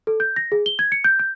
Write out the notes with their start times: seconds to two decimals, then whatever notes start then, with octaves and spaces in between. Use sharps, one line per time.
0.07 A4
0.20 G6
0.36 A#6
0.52 G#4
0.66 G7
0.79 G#6
0.92 C#7
1.04 G6
1.19 G6